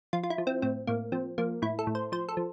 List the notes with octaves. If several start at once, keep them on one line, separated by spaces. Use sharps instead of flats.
F3 F4
F4
E4
F3
C4
A2 C4
A2 A#3
F3 C4
F3 A#3
A2 E4
A4
A2
C5
F3 C5
A4
F3